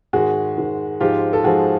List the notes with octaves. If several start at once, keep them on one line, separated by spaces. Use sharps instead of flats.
G#2 D#3 G#3 F#4 G#4
G#2 D#3 G#3
G#2 F3 G#3 F4 G4
A4
G#2 F3 G#3 F#4 G#4